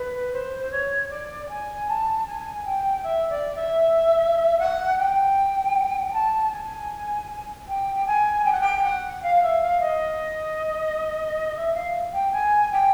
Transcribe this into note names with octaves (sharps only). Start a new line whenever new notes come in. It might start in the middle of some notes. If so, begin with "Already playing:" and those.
Already playing: B4
C5
C5
C#5
D5
G#5
A5
G#5
G5
E5
D5
E5
F#5
G5
A5
G#5
G5
G5
G#5
G5
F#5
G5
F#5
F5
E5
F5
D#5
E5
F5
G5
G#5
G5